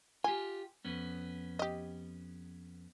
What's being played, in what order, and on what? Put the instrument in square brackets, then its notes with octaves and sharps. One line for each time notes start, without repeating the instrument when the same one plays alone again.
[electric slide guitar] F4 G4 [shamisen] G#5
[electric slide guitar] F2 B3 C#4
[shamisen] G4 D#5